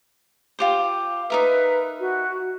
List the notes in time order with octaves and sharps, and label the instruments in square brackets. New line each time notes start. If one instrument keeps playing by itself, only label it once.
[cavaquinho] F4 G4 C5
[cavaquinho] D#4 A#4 E5 [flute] B4
[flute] F#4